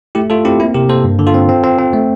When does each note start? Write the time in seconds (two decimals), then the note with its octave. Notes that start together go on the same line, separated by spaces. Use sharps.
0.15 A3 E4 G4
0.30 A3 F4 A4
0.45 C4 E4 G4
0.60 A#3 E4
0.74 C3 G4 A#4
0.89 A#3 A4 C5
1.04 G2
1.19 D3
1.27 F4 A4
1.34 C4
1.49 C4
1.64 C4
1.79 C4
1.93 A3